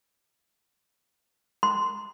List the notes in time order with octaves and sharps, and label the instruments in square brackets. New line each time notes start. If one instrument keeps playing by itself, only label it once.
[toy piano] C6